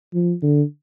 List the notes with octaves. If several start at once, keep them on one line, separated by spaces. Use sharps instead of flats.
F3
D3